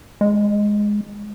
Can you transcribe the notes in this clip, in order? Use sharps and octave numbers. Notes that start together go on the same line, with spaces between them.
G#3